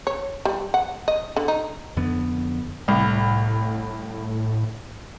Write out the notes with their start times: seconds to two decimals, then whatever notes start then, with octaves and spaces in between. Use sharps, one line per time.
0.07 C#5
0.45 G3
0.74 F#5
1.08 D#5
1.36 D3
1.48 D#4
1.97 F2 D3 B3
2.88 C2 A2